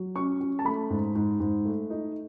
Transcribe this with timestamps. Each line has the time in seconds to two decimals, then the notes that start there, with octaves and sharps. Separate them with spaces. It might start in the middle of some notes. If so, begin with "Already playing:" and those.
Already playing: F#3
0.15 C#4 C#6
0.40 C#4
0.59 A5
0.65 A3 B5
0.90 G#2
1.15 G#2
1.40 G#2
1.65 A3
1.90 D#4